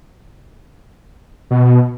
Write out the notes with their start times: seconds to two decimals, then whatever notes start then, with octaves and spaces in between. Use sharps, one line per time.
1.51 B2